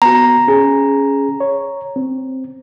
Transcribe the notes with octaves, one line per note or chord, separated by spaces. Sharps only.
B3 F#4 A#5
C#4 G#4
C#5
C4